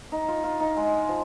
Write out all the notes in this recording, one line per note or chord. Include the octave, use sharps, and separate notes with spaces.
D#4
F4
F4
D#4
G#3
F3